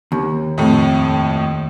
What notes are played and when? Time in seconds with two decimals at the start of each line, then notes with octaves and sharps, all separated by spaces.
0.12 D#2
0.58 F2 A2